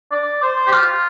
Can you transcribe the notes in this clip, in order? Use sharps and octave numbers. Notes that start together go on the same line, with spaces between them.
D5
C5
G4
F4